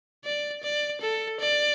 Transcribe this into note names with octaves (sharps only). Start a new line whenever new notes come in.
D5
D5
A4
D5